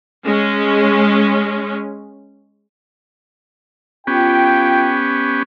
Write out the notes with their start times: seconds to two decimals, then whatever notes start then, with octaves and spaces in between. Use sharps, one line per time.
0.24 G#3 C#4
4.07 B3 C#4 F4 G4 G5